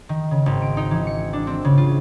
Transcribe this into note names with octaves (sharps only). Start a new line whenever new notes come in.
D#3
C#3
G#1
D7
D#4
E3
C#7
D4
C4
C#3
F4